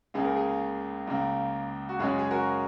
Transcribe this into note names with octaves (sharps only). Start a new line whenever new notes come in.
C#2 C#3 A#3 G#4
A#4
G#4
C#2 C#3 A#3
F#4
F#2 C#3 G#3 C#4 G#4
G#4
F#4 A#4